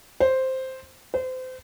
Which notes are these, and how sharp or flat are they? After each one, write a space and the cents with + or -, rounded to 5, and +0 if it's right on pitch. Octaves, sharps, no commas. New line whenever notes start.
C5 +0
C5 -30